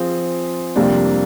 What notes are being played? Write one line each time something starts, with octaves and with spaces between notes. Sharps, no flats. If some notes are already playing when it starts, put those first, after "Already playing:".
Already playing: F3 C4 F4 G#4
F2 C3 G3 A#3 D4